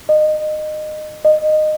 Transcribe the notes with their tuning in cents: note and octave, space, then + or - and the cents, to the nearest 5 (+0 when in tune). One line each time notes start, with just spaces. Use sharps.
D#5 -25
D#5 -20